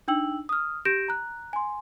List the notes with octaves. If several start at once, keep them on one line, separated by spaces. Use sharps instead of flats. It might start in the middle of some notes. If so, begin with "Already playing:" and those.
D4 D#4 G5 E6 F#7
D#6 F6
G4 G6 A#6 D7 E7
A#5 F#6
G#5 C6